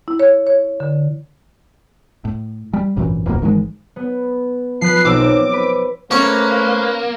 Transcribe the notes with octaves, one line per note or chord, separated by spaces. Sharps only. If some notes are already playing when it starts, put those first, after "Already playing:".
E4
C#5
C#5
D3
A2
G3
G#1 F#2 A#2 E3
D1 B1 F2 A#3
G#1 D#3 E3 G#3
B3
F3 B4 C7
B1 C4 D6 E6
C4
B4
A3 A#3 C#4 B4 C5 F5